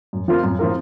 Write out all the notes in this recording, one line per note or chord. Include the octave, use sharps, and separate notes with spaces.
F#2
F3 C4 F4 A#4
F#2
F3 C4 F4 A#4